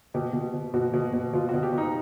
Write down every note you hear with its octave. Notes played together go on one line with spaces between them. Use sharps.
B2 G4
B2
B2
B2 F#4
B2
B2
B2 F4
F#4
B2
G4
B2
D#4